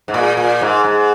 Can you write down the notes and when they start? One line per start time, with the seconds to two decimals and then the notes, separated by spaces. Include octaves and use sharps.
0.08 G#2
0.14 A#2
0.37 A#2
0.61 G#2
0.84 G#2